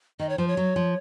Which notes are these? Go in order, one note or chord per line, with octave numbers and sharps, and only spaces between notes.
D#3 D#5
C#5
F3 C5
C#5
F#3
F3